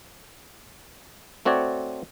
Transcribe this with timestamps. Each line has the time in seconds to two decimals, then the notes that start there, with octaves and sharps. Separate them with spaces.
1.45 A3 C4 F#4 C#5 D5